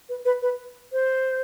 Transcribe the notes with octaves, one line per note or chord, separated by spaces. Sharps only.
B4
B4
B4
C5